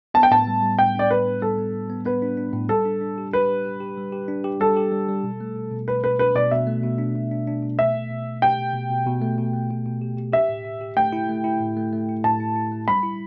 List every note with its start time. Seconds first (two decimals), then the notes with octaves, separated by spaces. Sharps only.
0.14 B3 A5
0.23 G5
0.31 A2 A5
0.47 G3
0.63 G3
0.79 G3 G5
0.95 D4 D5
1.10 A2 B4
1.27 B3
1.42 G3 A4
1.58 B3
1.74 A2
1.89 B3
2.06 B3 B4
2.22 D4
2.37 D4
2.53 A2
2.69 G3 A4
2.85 D4
3.01 D4
3.18 G4
3.33 G4 B4
3.48 G4
3.65 G4
3.80 G4
3.97 G3
4.12 G4
4.28 D4
4.44 G4
4.60 G3 A4
4.77 G4
4.92 G3
5.09 G3
5.23 B2
5.41 A3
5.56 B2
5.71 B2
5.87 B2 B4
6.03 B2 B4
6.19 D4 B4
6.35 B2 D5
6.51 B2 E5
6.67 A3
6.83 B2
6.98 D4
7.15 B2
7.31 D4
7.47 D4
7.63 B2
7.79 A3 E5
7.95 B2
8.10 B2
8.27 B2
8.42 G4 G5
8.58 B2
8.73 B2
8.90 B2
9.06 B2
9.22 A3
9.38 B2
9.54 A3
9.70 B2
9.86 B2
10.01 G4
10.17 G4
10.33 G4 E5
10.48 A2
10.65 G4
10.81 G4
10.97 A3 G5
11.13 E4
11.29 A3
11.44 E4
11.60 A2
11.77 A3
11.93 A3
12.09 E4
12.24 A2 A5
12.40 E4
12.56 E4
12.72 A3
12.88 G3 B5
13.03 E4